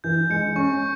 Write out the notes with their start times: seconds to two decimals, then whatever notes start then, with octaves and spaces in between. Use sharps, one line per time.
0.04 E3 G6
0.30 G#3 C#7
0.56 C#4 C#6